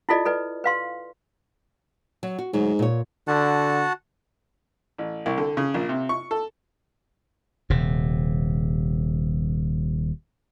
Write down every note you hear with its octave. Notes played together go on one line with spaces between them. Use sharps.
E4 F4 A4 D5 D#5
A4 B4 D5
B4 F5 C6
F#3
F#4
D2 G#2 F#3
A#2 C#5
D3 F#4 F#5 A5
A1
C2
D3
C#3
A#1
C3
C#6
A4
D#1 C3